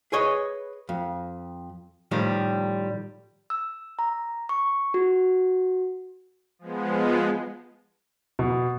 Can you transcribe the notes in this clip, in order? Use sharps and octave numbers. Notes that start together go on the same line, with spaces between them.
G#4 B4 C#5 D#5
F2
A2 D#3 F3 G3
E6
A#5
C#6
F#4
F3 G#3 B3
B2